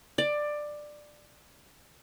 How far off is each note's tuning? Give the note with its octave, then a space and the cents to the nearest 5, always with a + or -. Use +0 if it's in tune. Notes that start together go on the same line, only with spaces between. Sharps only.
D5 +15